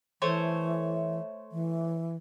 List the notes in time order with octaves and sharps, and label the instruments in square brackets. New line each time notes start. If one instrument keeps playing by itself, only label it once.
[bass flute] E3 [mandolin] A3 C5 C#5
[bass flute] E3